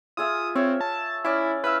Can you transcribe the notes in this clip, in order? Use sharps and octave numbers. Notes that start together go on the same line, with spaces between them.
F4 G#4 E5 D#6
C4 C#5 E5
A5
C#4 E4 D5
E4 B4 F5 E6